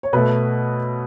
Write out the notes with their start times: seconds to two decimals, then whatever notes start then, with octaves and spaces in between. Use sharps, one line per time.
0.03 C#5
0.13 B2 A3 B4